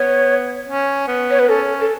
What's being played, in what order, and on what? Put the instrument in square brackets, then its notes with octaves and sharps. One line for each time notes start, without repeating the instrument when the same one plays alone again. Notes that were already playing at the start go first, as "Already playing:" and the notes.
Already playing: [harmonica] B3 [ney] C#5
[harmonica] C#4
B3
[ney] C#5
B4
[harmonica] C#4 [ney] A4
[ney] A4